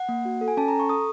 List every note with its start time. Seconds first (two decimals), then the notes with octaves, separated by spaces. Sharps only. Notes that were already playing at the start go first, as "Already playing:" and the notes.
Already playing: F#5
0.09 A#3
0.25 F#4
0.41 A4
0.48 G#5
0.57 C#4 A5
0.68 A#5
0.73 A4
0.80 C#6
0.89 A4 D#6